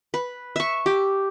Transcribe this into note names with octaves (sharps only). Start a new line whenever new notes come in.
B4
E5 C#6
G4